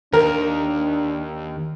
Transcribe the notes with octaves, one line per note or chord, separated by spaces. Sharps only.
D#2 D4 A#4